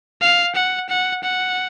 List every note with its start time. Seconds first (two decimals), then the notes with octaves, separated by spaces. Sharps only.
0.21 F5
0.55 F#5
0.89 F#5
1.23 F#5